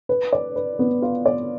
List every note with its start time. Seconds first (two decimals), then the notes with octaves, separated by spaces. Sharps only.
0.09 B4
0.33 D5
0.56 B4
0.79 B3
1.02 F4
1.26 D5